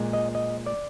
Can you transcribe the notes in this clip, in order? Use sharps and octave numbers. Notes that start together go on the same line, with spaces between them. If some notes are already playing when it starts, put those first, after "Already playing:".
Already playing: A#2 G#3
D#5
D#5
D5